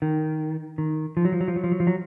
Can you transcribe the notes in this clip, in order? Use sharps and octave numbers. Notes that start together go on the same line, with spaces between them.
D#3
D#3
F3
F#3
F3
F#3
F3
F#3
F3
F#3
F3
F#3